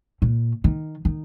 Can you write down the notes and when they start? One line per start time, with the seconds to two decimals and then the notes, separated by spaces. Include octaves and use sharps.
0.22 A#2
0.64 D#3
1.05 D#3